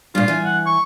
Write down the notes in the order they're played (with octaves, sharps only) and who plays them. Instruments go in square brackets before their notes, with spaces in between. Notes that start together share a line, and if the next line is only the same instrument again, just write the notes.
[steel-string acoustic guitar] G2 A#2 [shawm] F4
[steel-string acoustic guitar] E3 G#5
[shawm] F#5
C#6